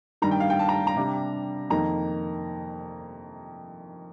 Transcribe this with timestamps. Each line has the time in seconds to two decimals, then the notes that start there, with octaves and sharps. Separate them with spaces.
0.22 G2 D#3 G3 A#5
0.31 G5
0.40 F5
0.50 G5
0.59 A5
0.68 A#5
0.87 A#5
0.96 C3 G3 D4
1.70 F2 D#3 A#3 D#4 A#5